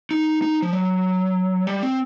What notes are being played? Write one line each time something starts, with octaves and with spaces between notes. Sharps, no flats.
D#4
D#4
F3
F#3
G3
C4